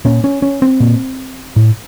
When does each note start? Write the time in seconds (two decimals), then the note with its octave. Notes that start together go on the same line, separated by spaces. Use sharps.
0.05 A#2 C#4
0.24 C#4
0.42 C#4
0.62 C4
0.80 A#2
1.56 A2